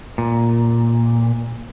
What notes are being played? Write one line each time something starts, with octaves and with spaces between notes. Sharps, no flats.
A#2